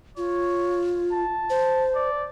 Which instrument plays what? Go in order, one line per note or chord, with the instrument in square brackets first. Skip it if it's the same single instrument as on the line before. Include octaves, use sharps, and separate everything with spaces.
[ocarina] F4 [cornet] C#5
[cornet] A5
[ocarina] C5
[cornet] D5